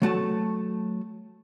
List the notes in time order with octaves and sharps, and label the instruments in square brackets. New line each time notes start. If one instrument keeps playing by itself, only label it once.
[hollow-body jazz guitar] F#3 A3 F#4 A5